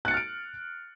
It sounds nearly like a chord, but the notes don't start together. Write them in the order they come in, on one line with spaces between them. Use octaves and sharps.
F#6 C#7 A6 F6 D7